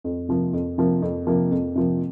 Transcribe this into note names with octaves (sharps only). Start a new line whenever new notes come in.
F2
C3 F3 A#3
F2
C3 F3 A#3
F2
C3 F3 A#3
F2
C3 F3 A#3